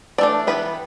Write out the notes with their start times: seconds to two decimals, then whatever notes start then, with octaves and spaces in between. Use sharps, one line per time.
0.18 E3 A3 D4 D5
0.47 E3 G3 B3 B4